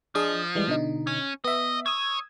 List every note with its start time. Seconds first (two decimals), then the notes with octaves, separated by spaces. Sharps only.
0.15 F3 D4 G#4 D#5
0.55 E3 G3 G#3
0.68 B2 D3 D#4
1.07 C#4
1.44 B3 D#5 E5
1.86 C#5 D#6 E6 G#6